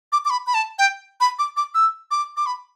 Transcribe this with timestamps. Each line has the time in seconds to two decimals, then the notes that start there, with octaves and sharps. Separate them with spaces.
0.12 D6
0.25 D6
0.30 B5
0.47 B5
0.54 A5
0.79 G5
1.21 B5
1.39 D6
1.57 D6
1.74 E6
2.11 D6
2.37 D6
2.46 B5